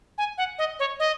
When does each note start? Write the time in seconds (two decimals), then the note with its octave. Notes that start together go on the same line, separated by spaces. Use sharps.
0.18 G#5
0.38 F#5
0.58 D#5
0.79 C#5
1.00 D#5